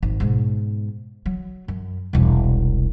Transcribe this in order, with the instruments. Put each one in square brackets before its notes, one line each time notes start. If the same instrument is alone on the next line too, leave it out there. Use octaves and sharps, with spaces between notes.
[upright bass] G#1
G#2 B2
F#3
F#2
E1 C2